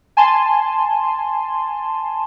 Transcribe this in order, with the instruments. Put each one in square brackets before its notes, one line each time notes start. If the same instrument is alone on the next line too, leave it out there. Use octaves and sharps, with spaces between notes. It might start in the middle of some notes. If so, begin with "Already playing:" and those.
[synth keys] G#5 A5 C6